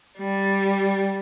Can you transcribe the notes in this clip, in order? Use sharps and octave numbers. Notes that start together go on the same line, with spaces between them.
G3